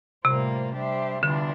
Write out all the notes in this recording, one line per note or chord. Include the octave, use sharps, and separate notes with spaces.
A2 C3 G3 A#3 F4 C5
G3 D4 G4 C5 E5
E2 D3 E3 G3 D4 F4